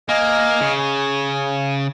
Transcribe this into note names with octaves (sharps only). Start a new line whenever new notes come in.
A#3 D#5 G#5 F6
C#3
G#5